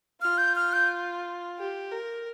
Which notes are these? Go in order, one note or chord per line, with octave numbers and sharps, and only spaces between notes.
F4 F6
G6
F6
G6
G4
A#4